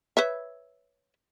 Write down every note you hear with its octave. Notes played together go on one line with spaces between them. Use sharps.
B4 C#5 E5